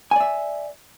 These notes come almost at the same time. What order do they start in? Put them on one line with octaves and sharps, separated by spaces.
G#5 D5 E5